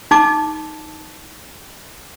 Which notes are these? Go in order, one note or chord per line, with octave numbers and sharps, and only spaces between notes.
D#4 A5 D6